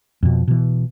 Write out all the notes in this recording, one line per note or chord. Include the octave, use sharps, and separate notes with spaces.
F2 B2
B2 E3